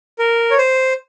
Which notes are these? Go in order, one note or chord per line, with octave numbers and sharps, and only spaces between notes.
A#4
C#5
C5